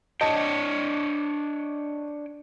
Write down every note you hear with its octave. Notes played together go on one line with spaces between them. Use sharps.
D4 C#5 D#5 G5 A5